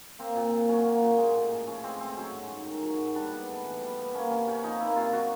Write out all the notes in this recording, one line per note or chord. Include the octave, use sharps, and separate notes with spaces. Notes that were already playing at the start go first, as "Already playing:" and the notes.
A#3 C4
A#2
A#2
F#3 C#4
A#3
A#2
G#3
A2
A2
F3 C#4
G#3 C4
A2 C4
F#3 C#4
G#2
G#2
D#3
F#3
G#2
G3 D4
B3
A2
E3
G3
B3
A#3 C#4
C3 C#4
C3 C#4
F3 D#4
A#3 E4
C3 F4
F#3 F#4